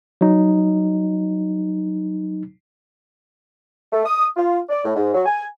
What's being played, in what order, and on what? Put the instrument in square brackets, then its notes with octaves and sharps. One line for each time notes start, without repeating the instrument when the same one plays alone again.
[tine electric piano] F#3 D#4
[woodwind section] A3
D#6
F4
D5
A2
G#2
F#3
G#5